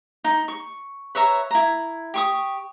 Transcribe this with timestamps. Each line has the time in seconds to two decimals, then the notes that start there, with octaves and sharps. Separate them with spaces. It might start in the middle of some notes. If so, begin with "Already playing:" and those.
0.24 D#4
0.48 C#6
1.15 B4 C#5 E5 A#5
1.51 E4 A#5
2.14 G4 C#6 D#6